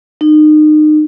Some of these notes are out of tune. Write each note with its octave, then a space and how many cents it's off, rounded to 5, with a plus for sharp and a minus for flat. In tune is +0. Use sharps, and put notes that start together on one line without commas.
D#4 -30